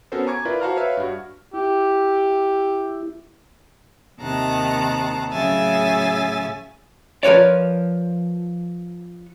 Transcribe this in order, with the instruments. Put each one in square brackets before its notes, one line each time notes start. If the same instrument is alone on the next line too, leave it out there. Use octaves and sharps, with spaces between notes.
[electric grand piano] B3 C#4 F#4 A4 A#4 C5
G#5 A#5 C#6 D6 G#6
E4 F4 A#4 B4 D5
F#4 C5 F5 A5 A#5 F6
B4 C#5 E5 F5
G2 F#4
[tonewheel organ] E4 [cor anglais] G4
[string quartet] D#2 C3 D#3 A5 A#5 F#6
A2 C#3 F#3 E5 G#5 A6
[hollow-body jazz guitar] F3 A#4 B4 C#5 D5